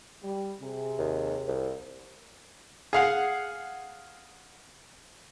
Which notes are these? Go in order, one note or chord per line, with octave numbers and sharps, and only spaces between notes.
G3
C3 G#4
D#2
C2
G#4 F5 F#5